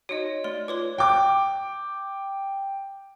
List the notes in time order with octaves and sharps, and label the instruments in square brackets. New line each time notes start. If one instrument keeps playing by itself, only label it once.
[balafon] D#4 F#4 [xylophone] C#5 D#5
[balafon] A3 [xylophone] D5 C6
[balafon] F4 [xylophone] B4 C#5 C6
[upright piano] G5 D6